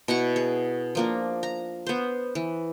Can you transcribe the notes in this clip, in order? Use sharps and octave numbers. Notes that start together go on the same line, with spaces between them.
B2 E4 F#5 C#6
G#4
F3 A#3 D4
A#5
B3 C5
E3